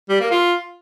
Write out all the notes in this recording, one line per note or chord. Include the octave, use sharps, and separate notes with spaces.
G3
A#3
F4